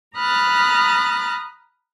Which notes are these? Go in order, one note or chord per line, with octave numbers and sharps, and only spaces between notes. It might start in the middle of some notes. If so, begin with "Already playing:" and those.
A#5 B5 D#6 F6 F#6 A6